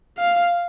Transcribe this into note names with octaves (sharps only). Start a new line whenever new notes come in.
F5